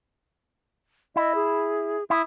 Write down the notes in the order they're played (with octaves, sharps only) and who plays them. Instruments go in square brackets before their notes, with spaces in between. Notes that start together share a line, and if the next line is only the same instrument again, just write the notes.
[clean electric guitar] E4 [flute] D#5
[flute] G#4
[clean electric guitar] E4 [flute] D#6